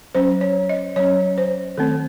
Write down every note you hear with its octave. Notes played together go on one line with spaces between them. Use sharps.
F#3 C#4 C5
C#5
D#5
F#3 C#4 C#5
C5
D#3 A3 C4 A4